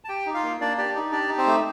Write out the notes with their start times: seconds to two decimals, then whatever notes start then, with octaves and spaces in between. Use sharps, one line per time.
0.05 A5
0.09 G4 G5
0.26 D#4
0.34 F4 F5
0.43 A#3
0.61 A#3 D4 D5
0.77 D4 G4 D5
0.95 D#4
1.12 D4 G4 D5
1.29 D#4
1.38 C4 C5
1.47 A3